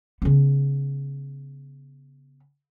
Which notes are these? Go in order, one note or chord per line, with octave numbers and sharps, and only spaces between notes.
C#3 B3